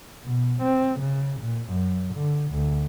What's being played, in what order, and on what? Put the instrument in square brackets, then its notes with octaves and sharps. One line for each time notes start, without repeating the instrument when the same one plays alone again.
[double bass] B2
C4
C#3
A#2
F#2
D3
D2